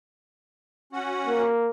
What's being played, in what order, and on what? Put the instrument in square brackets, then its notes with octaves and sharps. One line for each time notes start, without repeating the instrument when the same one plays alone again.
[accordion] C#4 F#4 F#5
[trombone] A#3